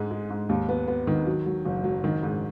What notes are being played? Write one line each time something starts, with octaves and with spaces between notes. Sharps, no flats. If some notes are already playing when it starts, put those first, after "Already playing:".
Already playing: G#2 G#3
G#3
G#2
D#2
B3
B3
D#3
F#3
F#3
F#1
F#3
D#3
G#2